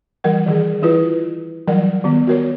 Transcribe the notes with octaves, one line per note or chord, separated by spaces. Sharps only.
E3 G3 A#4 F#5
D#3 E3 G#4
E3 E4 F4 B4
E3 F#3 G3 A#4 D5
D#3 B3
F#4 A#4 C#5